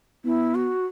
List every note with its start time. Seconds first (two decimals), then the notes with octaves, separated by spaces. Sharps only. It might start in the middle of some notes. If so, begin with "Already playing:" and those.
0.25 B3 E4
0.55 F#4